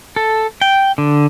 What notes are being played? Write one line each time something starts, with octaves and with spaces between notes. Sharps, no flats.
A4
G5
D3